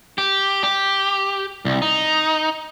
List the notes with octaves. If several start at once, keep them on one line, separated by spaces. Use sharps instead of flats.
G4
G4
C2
D#4